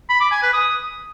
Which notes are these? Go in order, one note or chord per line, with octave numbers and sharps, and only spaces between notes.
B5
D6
G#5
B4
D#6